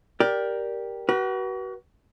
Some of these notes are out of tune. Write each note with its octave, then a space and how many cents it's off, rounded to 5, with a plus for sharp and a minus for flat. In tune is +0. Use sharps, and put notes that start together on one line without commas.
G4 +0 A#4 +10 D5 +0
F#4 +35 B4 -35